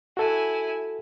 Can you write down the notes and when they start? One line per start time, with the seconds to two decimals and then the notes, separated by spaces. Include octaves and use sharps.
0.17 E4 F#4 A4 G#5